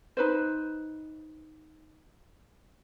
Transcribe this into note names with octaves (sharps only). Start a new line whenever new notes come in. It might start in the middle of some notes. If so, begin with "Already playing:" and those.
D#4 B4 C5